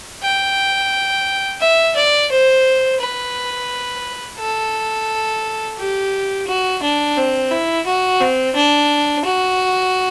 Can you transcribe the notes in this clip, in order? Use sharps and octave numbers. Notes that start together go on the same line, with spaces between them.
G5
E5
D5
C5
B4
A4
G4
F#4
D4
C4
E4
F#4
C4
D4
F#4